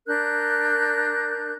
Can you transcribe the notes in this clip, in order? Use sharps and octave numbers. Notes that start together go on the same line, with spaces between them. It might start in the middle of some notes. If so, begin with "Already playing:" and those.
D4 A#4 F#6 G6